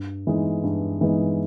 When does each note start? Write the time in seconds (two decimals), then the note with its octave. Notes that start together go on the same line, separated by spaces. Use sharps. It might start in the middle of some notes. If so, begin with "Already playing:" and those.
Already playing: G2
0.27 E3 G#3 B3 D#4
0.64 G2
1.01 E3 G#3 B3 D#4